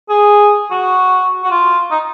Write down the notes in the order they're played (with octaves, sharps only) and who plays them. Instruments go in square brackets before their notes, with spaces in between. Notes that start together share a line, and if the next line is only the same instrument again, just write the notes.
[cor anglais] G#4
F#4
F#4
F4
D#4